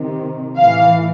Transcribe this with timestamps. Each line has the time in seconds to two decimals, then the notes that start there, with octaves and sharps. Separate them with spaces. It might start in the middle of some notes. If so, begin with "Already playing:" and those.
Already playing: C3 D#3
0.57 A2 E3 F5